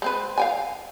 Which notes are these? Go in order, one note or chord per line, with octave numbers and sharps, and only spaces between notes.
G#3 C4 B4
F5 G5 G#5